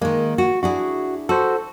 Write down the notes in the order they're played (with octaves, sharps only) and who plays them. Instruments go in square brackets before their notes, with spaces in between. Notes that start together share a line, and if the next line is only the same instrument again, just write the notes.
[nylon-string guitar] D#3 G#3 [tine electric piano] A#3
[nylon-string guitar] F#4
[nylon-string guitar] D4 E4 G#4 [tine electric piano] F#4
[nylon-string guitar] F#4 [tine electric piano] A4 C5